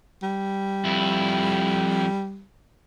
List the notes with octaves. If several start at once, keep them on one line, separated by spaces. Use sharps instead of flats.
G3
F2 E4